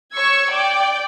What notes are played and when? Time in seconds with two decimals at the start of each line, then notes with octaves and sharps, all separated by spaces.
0.16 C#5 C#6 E6 G#6
0.50 D5 G5 D6